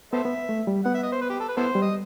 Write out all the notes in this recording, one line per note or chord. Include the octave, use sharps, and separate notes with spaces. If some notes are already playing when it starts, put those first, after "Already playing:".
B3 A4 C5 E5
B3
A3
G3
B3 F#5
E5
D#5
C5
B4
G4
A4
B4
B3 E4 A4 C5
G3
D#5